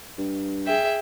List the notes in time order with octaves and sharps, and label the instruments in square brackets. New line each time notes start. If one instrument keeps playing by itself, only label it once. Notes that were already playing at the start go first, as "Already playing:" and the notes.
[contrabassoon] G2
[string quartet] G#4 E5 G5